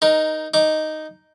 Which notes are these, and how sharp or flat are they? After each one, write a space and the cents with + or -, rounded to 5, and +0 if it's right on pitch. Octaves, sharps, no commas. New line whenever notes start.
D#4 +0 A#4 +15
D#4 +0 D6 +0